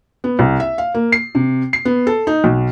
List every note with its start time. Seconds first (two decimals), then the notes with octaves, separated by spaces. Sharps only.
0.24 B3
0.39 C2
0.60 E5
0.78 F5
0.94 A#3
1.12 C7
1.35 C3
1.73 C7
1.85 B3
2.07 A4
2.27 D#4
2.44 B1